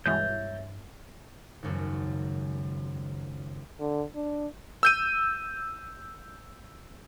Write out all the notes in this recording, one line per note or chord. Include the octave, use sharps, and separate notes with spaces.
G2 B2 E3 G#3 C#5 E5 G6 A6
G#1 C#2 F#2 C#3 F#3
D3
D4
E6 G6 D#7